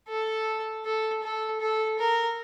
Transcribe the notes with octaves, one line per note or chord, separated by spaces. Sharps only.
A4
A4
A4
A4
A#4